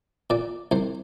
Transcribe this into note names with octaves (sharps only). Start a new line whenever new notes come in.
A#2 D5
C2 C5